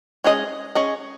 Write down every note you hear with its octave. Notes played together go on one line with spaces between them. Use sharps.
G#3 C#4 G#4 D#5
C#4 G#4 D#5